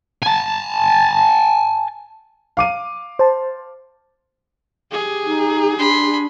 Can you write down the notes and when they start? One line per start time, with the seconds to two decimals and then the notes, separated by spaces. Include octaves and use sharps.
0.23 G#5 A5
2.57 F5 D6 D#7
3.19 C5 A5
4.92 G4 G#4
5.26 D#4
5.78 D4 B5 C6